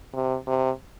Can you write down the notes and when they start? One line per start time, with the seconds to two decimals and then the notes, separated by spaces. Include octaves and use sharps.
0.14 C3
0.47 C3